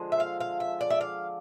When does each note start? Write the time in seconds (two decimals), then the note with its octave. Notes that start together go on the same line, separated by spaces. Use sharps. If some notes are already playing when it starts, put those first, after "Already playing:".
Already playing: D3 F3 G#3
0.12 E5
0.20 F5
0.41 F5
0.60 E5
0.81 D5
0.90 E5
1.01 F5